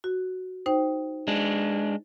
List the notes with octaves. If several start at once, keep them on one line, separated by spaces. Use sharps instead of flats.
F#4
D#4 C5 G5
G#3 D4